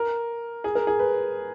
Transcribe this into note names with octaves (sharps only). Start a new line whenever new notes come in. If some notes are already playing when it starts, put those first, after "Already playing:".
Already playing: A#4
G#4
A#4
G#4
B4